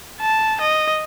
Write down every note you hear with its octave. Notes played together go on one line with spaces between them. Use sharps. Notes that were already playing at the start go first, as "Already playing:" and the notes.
A5
D#5